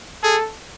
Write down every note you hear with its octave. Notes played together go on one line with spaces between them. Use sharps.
G#4 A4